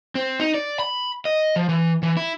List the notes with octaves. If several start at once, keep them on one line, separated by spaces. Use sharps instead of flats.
C4
D#4
D5
B5
D#5
F3
E3
E3
E4